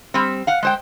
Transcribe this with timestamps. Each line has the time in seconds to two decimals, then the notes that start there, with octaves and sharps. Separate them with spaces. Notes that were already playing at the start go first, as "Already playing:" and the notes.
0.14 G3 C4
0.47 F5 F#5
0.63 G#3 C5 G5